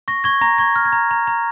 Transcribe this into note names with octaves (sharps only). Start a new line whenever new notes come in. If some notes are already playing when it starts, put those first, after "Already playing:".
C#6 A#6
C#6 G#6
A#5 A#6
C#6 G#6
F6
G#6
A#5
A#5
A#5